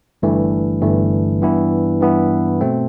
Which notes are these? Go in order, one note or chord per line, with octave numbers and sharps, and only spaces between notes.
G1 G2 E3 A3
G1 G2 E3 A3
G2 E3 B3 E4
G2 E3 B3 E4
B2 A3 C4